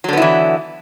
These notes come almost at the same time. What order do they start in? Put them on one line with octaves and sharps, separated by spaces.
F#3 D3 B3 E4 E3